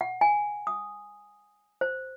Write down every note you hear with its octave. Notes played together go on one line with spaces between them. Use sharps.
F#5
G#5
D#6
C5